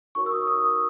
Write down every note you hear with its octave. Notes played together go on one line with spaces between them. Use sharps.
D#4 F#4 A#4 C#5 C#6
E6
D#6
D#6